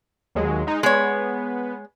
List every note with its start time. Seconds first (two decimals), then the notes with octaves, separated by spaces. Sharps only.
0.35 D#2 F#3 G#3
0.67 G#3 D#4
0.83 G#3 B3 C#5